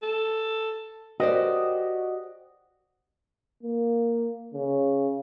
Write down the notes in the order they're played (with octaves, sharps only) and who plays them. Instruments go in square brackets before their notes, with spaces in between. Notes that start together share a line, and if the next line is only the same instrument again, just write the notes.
[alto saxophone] A4
[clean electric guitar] F#4 G4 D#5 [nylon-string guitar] A#4 C5 D5
[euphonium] A#3
C#3